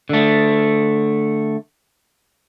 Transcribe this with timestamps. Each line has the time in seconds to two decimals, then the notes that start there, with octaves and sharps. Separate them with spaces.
0.09 D3 A3